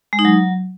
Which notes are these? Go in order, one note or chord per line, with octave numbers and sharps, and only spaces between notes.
G#3
D#4
F#3